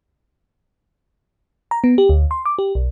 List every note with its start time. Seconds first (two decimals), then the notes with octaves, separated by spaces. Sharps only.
1.71 A#5
1.84 B3
1.98 G4
2.09 D2
2.31 C6
2.46 D6
2.59 G4
2.75 B1